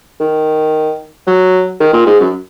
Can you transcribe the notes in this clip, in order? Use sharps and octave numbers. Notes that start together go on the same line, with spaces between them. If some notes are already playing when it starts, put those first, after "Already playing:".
D#3
F#3
D#3
A#2
G#2
F#2